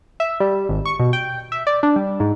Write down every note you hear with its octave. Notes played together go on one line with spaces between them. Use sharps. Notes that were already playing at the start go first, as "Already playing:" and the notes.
E5
G3
G#1
C#6
B2
G5
E5
D5
D4
G3
G#2